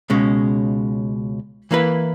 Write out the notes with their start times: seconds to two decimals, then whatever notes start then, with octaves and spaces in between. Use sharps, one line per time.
0.10 C#2 B2 G#3 C#4
1.71 E3 A#3 E4 B4